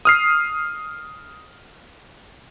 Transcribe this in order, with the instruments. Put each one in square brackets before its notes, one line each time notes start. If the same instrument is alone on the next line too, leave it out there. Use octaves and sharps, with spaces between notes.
[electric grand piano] D#6 F6 C7